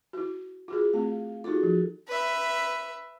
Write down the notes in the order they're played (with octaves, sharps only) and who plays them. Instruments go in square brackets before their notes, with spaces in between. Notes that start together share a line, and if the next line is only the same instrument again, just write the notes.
[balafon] E4 F#4
F4 F#4 G#4
[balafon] A3 C4 [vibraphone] F5
[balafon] D#4 F4 [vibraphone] F#4 G#4 A4
[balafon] F3
[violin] B4 E5